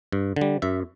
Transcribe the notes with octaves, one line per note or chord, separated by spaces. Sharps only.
G2
D3 G3
F#2 E5